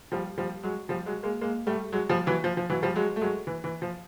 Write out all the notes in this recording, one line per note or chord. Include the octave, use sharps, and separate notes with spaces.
F3 G3
F3 G3
F#3 G#3
F3 G3
F#3 G#3
G#3 A#3
G#3 A#3
G3 A3
F#3 G#3
F3 G3
E3 F#3
F3
F3
E3 F#3
F3 G3
F#3 G#3
A3
F#3 G#3
E3
E3
F3